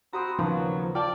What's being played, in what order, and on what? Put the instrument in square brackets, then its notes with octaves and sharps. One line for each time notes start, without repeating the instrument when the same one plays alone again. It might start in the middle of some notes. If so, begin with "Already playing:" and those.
[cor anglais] C4 [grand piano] F#4 B5 D#6 [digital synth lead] A#5
[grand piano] D#2 B3 [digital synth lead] C#3 [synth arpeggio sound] F3 [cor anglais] F#3
[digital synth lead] F4 [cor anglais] D5 [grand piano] G5 A5